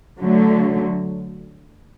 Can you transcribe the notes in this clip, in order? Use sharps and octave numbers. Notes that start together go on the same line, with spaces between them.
D3 F#3 A3